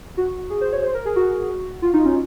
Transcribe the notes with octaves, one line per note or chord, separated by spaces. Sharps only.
F#4
G#4
C5
C#5
C5
A#4
G#4
F#4
F4
D#4
C#4